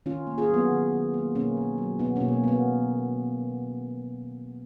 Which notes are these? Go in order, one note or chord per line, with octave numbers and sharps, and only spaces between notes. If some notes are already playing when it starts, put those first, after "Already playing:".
D#3 C#4 F4
A#3
F4 G#4
F#3 B3
D#3
D#3
A#3
B2 A#3 C#4
A#3
F#3
B2 B3 D#4
A#3 C#4
B2
A#3
B3
A#3
B3